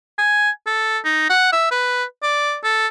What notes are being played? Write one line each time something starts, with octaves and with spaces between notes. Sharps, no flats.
G#5
A4
D#4
F#5
E5
B4
D5
A4